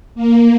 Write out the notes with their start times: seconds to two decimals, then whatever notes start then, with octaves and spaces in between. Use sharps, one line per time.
0.15 A#3